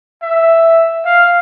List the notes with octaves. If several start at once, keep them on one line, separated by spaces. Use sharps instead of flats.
E5
F5